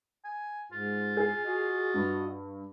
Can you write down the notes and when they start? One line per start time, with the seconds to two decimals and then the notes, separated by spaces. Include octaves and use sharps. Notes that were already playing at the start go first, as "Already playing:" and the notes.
0.24 G#5
0.72 G#2 F4
1.17 G#4
1.46 F#4 D#5
1.94 G2